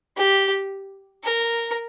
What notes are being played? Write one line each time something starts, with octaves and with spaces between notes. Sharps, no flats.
G4
A#4